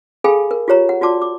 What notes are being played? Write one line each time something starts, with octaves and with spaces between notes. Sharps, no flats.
G#4 A4 F5 G5 G#5 B5
A#4
F4 G4 C#5 A#5
F#5
F4 F#4 D5 A5 D6
D6